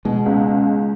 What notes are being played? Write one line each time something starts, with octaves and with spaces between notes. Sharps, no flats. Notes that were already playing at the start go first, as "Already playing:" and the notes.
B2 G#3
C#2